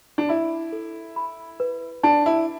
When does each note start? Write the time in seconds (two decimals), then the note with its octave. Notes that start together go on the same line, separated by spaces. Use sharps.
0.18 D4
0.29 E4 B5
0.72 A4
1.16 B5
1.60 B4
2.03 D4 A5
2.26 E4